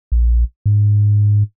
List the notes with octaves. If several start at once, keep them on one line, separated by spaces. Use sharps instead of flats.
A#1
G#2